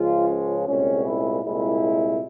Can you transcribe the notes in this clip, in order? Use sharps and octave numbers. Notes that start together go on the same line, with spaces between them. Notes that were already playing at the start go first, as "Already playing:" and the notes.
Already playing: C#2 C#3 F3 G#3 F4
C#4
C2 A#2 G#3 C#4
E4
C2 A#2 G#3 E4